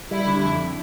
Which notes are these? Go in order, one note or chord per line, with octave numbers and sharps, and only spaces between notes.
G3 E4
D3
F2